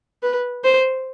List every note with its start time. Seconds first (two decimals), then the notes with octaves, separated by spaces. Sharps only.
0.23 B4
0.64 C5